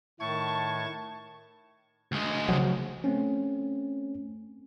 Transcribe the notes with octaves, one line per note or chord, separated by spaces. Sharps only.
A2 D#3 A3 A5 C#6 G#6
D2 G#3
C#3 F3 F#3
A3 C4 C#4